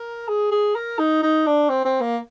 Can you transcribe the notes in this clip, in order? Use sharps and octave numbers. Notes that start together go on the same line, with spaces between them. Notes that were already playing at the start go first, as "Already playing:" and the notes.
Already playing: A#4
G#4
G#4
A#4
D#4
D#4
D4
C4
C4
A#3